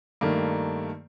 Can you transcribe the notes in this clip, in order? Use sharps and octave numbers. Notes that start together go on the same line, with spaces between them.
G2 D#3 A3 A#3